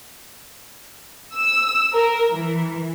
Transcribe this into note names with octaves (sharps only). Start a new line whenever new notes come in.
E6
A#4
E3